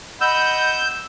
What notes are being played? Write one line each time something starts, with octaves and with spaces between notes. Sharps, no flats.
D#5 F#5 B5 E6 G6